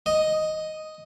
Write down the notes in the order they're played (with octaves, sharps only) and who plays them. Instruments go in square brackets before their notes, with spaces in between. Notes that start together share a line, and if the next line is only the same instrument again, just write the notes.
[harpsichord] D#5